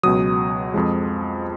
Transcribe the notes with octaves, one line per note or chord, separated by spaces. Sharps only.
C#2 B2 F#3 D#6
F2 F3 G#3